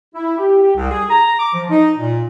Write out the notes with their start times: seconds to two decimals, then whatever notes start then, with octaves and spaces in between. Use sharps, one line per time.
0.15 E4
0.38 G4
0.62 G4
0.76 C2
0.90 G#4
1.10 A#5
1.39 D6
1.54 F3
1.70 D#4
1.98 A#2